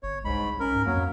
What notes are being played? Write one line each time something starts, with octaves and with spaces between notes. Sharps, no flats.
G1 C#5
C2 G#2 G#3 B5
C#4 A#4
G#2
F2 F#3 A#3